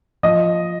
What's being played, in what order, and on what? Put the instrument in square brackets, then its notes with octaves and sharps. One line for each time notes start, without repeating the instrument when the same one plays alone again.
[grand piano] F3 D#5